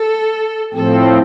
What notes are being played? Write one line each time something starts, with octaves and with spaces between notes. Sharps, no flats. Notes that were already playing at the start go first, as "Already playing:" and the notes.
Already playing: A4
A2 F3 C4 A4